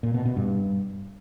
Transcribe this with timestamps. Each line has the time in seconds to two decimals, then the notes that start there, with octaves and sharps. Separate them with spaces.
0.03 A#2
0.14 B2
0.25 B2
0.37 G2